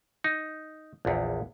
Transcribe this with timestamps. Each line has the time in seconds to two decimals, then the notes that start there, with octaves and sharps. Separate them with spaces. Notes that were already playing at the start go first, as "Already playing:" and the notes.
0.24 D#4
1.05 A#1 E2